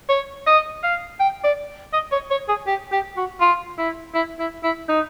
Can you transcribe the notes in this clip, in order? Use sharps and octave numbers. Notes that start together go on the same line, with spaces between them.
C#5
D#5
F5
G5
D5
D#5
C#5
C#5
G#4
G4
G4
F#4
F4
E4
E4
E4
E4
D#4